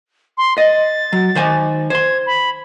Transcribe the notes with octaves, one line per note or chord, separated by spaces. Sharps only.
C6
D#5 A6
F#3
D#3 C5 G#5
C5 C6 G#6
B5